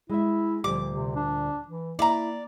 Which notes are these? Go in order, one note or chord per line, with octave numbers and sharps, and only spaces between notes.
G#3 E4 E5
D2 A#2 F3 G3 D6
C3
D4
E3
A#3 E4 D5 E5 A#5